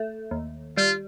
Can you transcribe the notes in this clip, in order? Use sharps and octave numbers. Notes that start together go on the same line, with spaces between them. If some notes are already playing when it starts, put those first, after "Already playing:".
Already playing: A3
D#2
G3 F4